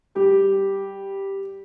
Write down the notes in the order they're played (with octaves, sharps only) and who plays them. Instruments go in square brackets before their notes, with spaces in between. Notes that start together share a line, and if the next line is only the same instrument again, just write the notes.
[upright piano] G3 G4